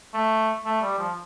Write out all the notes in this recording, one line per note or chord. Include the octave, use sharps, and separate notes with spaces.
A3
A3
G3
F3